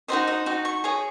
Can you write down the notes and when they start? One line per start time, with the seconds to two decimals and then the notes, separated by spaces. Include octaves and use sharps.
0.08 D#4 F#4 C5 D#5 A#5
0.27 D#5
0.46 D#4 F#4
0.65 C#6
0.84 G#4 C#5 D#6